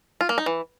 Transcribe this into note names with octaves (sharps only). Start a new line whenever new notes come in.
F4
A#3
D#4
E3